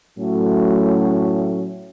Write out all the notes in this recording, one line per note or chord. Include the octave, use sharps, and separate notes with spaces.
A2 F#3 A3 C#4 F#4